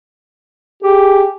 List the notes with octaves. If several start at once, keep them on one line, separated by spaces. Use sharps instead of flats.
G4 G#4